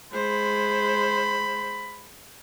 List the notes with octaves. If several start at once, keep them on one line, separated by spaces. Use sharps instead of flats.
G#3 C5 B5